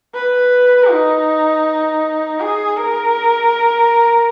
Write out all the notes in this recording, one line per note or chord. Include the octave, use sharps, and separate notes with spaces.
B4
D#4
G#4
A#4